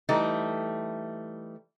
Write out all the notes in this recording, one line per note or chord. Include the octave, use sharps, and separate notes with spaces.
E3 G3 A3 D#4